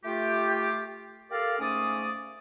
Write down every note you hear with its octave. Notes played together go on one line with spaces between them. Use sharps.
A3 F4 G4
G4 A4 A#4 D5 F5
G#2 A3 C#4 D5 D#6